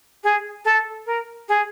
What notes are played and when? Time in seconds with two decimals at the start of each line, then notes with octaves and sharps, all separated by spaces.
0.23 G#4
0.64 A4
1.06 A#4
1.48 G#4